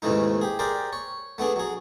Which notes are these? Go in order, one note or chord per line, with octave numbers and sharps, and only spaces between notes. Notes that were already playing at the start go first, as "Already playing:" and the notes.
D#2 G#2 C#3 E3 A3 D#4
G4 G#4
G4 G#4 A#4 C5 D5
C#5
A3 B3 D4 G#4
F#3 G#4